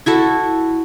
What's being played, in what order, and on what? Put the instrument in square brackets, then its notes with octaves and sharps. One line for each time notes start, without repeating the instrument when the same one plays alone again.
[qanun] E4 F#4 A4